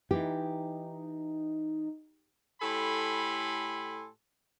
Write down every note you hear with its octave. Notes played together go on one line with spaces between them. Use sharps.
E3 D#4 G4
A2 G4 A4 G#5 B5 C6